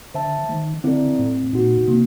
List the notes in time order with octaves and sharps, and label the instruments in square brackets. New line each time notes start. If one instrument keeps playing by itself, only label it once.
[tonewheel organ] D3 [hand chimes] C5 E5 A5
[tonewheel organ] D#3 [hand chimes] A3
[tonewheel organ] D3 [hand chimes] C4 E4 A4 D5
[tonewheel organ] A2 [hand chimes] C4
[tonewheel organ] A#2 [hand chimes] D#4 F#4
[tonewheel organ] C3 [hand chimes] A#3